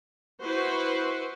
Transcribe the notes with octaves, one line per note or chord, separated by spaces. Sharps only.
E4 F#4 B4 C5